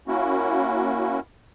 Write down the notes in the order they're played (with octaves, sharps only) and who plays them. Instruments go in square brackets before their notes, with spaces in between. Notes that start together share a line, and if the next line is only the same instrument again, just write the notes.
[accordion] A#3 C#4 E4 F#4